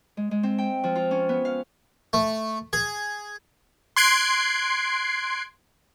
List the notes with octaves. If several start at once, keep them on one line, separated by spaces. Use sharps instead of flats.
G#3
G#3
C4
G5
F3
F4
C#4
B3
F5
A3
G#4
C6 F#6 G#6 C7 D7